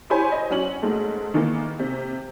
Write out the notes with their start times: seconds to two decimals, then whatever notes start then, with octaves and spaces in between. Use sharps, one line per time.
0.10 E4 G4 C5 C#5 G#5 B5
0.32 D#5
0.50 F#3 C#4 F#7
0.82 G#2 G#3 A3
1.34 D#3 E3 A#3
1.79 C3